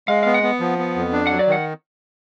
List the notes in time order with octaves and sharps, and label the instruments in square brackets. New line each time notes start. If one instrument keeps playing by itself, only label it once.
[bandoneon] G#3 [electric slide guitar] F5
[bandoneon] B3 [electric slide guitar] F5
[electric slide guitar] F#5
[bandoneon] B3
F3
B3
F2
D4
[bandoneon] F#3 [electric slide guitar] F#5
[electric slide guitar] D5
[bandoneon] D#3 [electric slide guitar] F#5